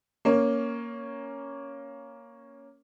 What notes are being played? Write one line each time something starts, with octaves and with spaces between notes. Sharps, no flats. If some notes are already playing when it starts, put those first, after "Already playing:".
A#3 C#4